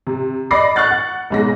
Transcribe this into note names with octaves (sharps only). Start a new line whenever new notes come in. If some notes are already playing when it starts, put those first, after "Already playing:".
C3
D5 D#5 B5 D6 A#6 C7
C#6 F6 F#6 A6
F#5
B1 G#2 A#6